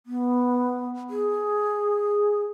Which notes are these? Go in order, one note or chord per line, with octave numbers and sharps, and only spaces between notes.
B3
G#4